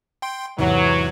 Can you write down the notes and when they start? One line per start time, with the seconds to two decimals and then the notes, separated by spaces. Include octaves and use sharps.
0.22 G5 C6
0.58 E2 G#2 C3 E3 F#3